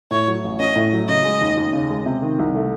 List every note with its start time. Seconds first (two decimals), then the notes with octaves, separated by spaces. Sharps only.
0.11 A2 C#5
0.28 F#3
0.44 A1
0.60 C#4 D#5
0.76 A2
0.93 F#3
1.08 C#3 D#5
1.25 G#3
1.41 D#2
1.57 D#2
1.73 C#3
1.90 G#3
2.06 C3
2.22 D#3
2.39 C2
2.55 A3